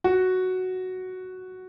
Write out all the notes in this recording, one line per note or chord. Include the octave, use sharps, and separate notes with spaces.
F#4